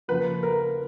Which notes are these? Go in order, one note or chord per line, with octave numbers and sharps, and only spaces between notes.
C#3 F3 A#3 B4
A#4